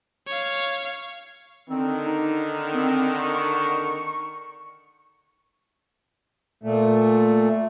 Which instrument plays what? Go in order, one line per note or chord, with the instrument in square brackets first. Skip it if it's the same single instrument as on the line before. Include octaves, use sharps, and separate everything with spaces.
[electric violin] C#5 F5
[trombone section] D3 D#3 [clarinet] C4
[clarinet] D#4
C4
C#6
[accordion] A#2 A3